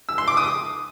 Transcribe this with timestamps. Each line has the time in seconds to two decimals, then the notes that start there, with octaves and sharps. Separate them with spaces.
0.09 E6
0.18 C6
0.28 D6
0.37 D#6